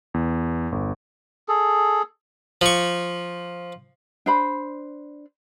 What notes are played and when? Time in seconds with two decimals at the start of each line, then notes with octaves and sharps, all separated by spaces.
0.14 E2
0.72 G1
1.48 G#4 A4
2.61 F3 C#6
4.26 D4 C5 B5